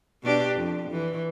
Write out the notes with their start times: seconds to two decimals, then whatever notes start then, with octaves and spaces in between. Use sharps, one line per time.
0.23 B2 D4 G4
0.55 F2
0.91 E3